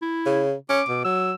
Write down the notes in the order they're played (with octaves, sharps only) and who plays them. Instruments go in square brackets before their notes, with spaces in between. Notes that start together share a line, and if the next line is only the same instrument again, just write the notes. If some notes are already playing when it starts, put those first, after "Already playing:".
[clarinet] E4
[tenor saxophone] C#3
[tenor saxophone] C#4 [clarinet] D6
[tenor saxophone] B2
[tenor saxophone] F#3 [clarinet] E6